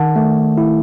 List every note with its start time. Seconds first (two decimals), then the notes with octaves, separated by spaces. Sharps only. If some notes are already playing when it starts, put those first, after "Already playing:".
Already playing: D#3 F#5 A5
0.16 A3
0.58 E4